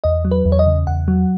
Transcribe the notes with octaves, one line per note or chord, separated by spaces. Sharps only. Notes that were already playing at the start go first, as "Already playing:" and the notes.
E2 D#5
F#3
B4
E2
C#5
D#5
C#3
E2 F#5
F#3